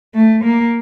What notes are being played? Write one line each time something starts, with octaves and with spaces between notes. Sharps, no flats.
A3
A#3